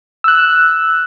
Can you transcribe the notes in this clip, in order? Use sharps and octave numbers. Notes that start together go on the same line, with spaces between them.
E6 F#6